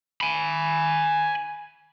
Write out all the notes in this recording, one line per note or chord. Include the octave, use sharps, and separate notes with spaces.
G#5 B5